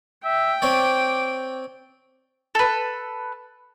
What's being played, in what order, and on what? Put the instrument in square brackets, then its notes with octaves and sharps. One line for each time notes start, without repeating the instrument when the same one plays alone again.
[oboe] E5 [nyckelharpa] G5
[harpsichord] C4 C#5 D5 [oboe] D6
[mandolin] A4 B4